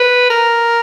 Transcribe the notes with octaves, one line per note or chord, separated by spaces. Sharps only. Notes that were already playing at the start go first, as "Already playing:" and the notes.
Already playing: B4
A#4